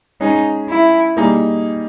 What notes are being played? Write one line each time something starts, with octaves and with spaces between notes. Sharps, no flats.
G#3 C#4 D#4 G#4
E4
G3 A#3 D#4 G#4